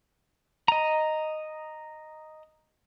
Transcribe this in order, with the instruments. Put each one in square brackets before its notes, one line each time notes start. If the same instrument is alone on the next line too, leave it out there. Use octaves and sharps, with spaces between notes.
[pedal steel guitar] D#5 A#5